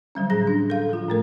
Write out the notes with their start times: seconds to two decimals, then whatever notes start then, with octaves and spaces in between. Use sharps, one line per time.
0.15 D3 F#3 G3 C#4
0.30 A2 G#4 A#6
0.47 D4
0.70 A4 F5
0.90 F3 F4
1.08 A2 A3 A#4